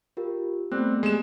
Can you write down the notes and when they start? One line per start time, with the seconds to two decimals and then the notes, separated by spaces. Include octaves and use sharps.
0.17 F4 G4 A#4
0.71 G3 A3 B3 C4 G4 F#6
1.03 G#3 E7